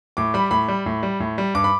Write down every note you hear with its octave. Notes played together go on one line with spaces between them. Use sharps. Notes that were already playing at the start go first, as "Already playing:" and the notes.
A2 D6
G3 B5
A2 B5
G3
A2
G3
A2
G3
G2 D6
B5